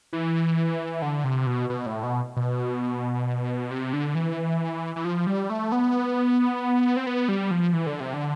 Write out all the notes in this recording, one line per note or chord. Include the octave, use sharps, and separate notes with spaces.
E3
D3
C3
B2
B2
A2
B2
B2
C3
D3
E3
E3
F3
G3
A3
B3
C4
B3
G3
F3
E3
D3
C3
D3